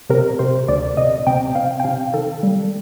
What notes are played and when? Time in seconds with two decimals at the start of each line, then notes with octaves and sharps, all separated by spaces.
0.10 C3 A#4
0.39 C3 C5
0.68 D2 D5
0.97 C3 D#5
1.27 C3 G5
1.55 C3 F5
1.80 G5
1.84 C3 F5
2.14 D#3 A4
2.43 G3